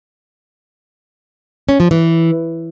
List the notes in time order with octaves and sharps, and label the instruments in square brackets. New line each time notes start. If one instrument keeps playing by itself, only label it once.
[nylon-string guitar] C#4
F3
E3